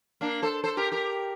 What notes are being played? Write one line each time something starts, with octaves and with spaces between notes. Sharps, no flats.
A#3 D4
A4 C5
A4 C5
G4 A#4
G4 A#4